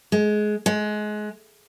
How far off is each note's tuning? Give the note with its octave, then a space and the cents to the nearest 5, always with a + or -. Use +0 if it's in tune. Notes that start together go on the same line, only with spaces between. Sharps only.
G#3 +20
G#3 +25